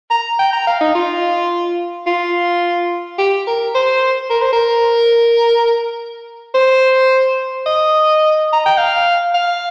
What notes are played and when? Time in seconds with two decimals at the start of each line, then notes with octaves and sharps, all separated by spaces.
0.11 A#5
0.39 G5
0.53 A#5
0.67 F5
0.81 D#4
0.95 F4
2.07 F4
3.18 G4
3.47 A#4
3.75 C5
4.30 A#4
4.42 C5
4.53 A#4
6.55 C5
7.66 D#5
8.53 A#5
8.66 G5
8.78 F5
9.34 F5